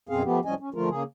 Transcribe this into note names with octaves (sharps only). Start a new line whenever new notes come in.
F#2 B2 C4 G#4 F5
F3 A3 B3 G4
A2 F3 G3 C#4 D#5 G#5
C#4
D3 F3 A3 F4 A#4
C#3 A#3 G#4